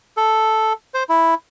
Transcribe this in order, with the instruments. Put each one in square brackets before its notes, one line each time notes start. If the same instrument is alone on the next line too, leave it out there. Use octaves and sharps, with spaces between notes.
[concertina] A4
C5
E4